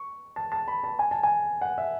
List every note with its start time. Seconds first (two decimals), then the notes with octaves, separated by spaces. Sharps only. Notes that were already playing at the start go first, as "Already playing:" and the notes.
Already playing: C#6
0.36 A5
0.52 A5
0.68 B5
0.84 A5
0.99 G#5
1.11 A5
1.23 G#5
1.61 F#5
1.78 E5